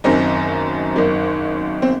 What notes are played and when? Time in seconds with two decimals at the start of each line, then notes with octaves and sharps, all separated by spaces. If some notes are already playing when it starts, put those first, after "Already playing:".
0.04 F#1 F#2 D#3 C4 D#4
0.96 F#1 F#2 D#3
1.82 C4